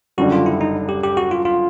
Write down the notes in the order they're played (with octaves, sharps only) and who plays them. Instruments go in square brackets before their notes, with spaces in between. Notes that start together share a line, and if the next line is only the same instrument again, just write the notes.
[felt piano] F#1 F#2 D3 G3 [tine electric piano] F#4
[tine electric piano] F4
E4
D#4
G4
G4
F#4
F4
F4